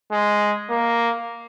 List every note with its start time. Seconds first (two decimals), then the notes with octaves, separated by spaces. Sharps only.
0.12 G#3
0.70 A#3